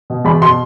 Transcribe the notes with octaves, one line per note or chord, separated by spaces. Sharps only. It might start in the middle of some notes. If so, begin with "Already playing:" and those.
B2
E2 B5
B2 C6